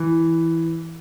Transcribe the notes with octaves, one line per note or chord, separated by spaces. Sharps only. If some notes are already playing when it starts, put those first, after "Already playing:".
Already playing: E3